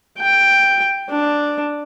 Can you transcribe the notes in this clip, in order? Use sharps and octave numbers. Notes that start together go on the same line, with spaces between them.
G5
D4